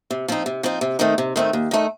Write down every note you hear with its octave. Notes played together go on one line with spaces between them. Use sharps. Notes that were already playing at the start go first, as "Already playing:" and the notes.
C3
F3 C4 D#4
C3
F3 C4 D#4
C3
D#3 A3 C4 D#4
C3
D#3 A3 C4 D#4
D#2
D#3 A3 D#4